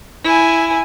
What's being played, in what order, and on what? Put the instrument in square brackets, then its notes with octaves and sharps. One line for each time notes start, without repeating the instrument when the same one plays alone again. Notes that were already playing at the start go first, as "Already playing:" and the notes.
[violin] E4 G#5